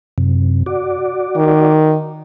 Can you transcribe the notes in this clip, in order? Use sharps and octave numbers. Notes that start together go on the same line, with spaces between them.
F#2 C3
F#4 D5
D#3